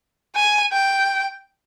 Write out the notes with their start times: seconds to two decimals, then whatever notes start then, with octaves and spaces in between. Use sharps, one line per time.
0.36 G#5
0.72 G5